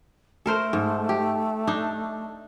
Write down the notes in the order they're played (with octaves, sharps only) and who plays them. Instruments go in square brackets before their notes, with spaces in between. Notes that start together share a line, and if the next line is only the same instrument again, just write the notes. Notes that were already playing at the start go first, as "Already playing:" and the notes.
[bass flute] A3 [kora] A4 A#4 C5
[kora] G#2
G4
D4 D#4